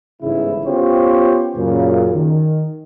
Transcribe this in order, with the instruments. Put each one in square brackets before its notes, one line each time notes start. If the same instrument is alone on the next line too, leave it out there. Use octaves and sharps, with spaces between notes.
[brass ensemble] G1 G#2 C#3 E3 G#3 E4
B3 C#4 F4 G4 C5 C#5
F#2 A#2 C#3
D#3